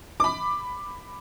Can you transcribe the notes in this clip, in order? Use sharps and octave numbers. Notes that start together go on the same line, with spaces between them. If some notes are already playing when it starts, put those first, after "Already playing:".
B5 D6